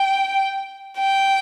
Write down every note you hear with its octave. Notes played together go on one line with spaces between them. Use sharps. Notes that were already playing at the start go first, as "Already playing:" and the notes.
Already playing: G5
G5